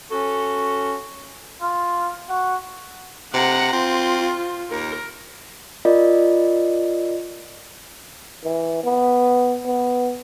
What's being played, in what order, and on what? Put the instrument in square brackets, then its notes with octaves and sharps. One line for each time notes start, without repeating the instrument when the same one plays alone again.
[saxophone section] C#4 F#4 A4
[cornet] F4
F#4
[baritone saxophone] C3 [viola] F#5 A#5
[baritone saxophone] C4 [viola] F4
[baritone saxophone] D#2 [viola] A#4
[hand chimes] F4 A#4 D5 D#5
[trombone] E3
B3
B3